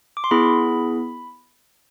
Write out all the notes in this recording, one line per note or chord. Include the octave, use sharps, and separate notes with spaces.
D6
C6
B3 E4 G#4 B5